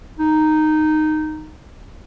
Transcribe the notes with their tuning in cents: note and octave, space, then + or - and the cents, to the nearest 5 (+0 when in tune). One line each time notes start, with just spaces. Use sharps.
D#4 -10